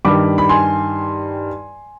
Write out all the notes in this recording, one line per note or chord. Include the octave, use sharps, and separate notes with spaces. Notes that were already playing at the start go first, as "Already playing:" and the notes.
G2 D#3 G3 B5 D6
B5
G#5 C6